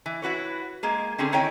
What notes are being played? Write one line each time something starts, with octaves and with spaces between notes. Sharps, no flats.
E3
E4 F#4 B4 C#5
G#3 A#3 G#4
D3 C4 C#4 G#4
D#3 D#4 E4 C#5 G5 G#5